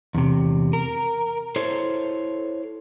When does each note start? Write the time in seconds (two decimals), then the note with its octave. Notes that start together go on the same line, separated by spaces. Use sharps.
0.15 E2 C3
0.73 A#4
1.56 E4 A4 C5 C#5